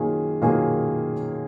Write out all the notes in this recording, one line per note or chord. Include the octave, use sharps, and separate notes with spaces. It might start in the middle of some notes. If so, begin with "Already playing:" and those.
Already playing: F#2 D#3 A#3 F4 G#4
F#2 D#3 A#3 F4 G#4